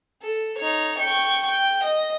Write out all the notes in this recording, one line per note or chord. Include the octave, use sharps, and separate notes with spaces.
A4
D#4 C#5
G5 C#6
G5
D#5